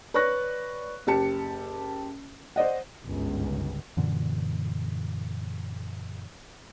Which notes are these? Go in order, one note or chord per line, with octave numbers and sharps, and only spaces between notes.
B4 C#5 D5 C#6 F#6 A#6
F#1 G4 A5 C#7
C5 D5 D#5 F#5
G1 C#2 G#2
F#2 A#2 D3 E3